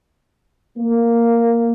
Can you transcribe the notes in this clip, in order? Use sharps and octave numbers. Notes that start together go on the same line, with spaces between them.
A#3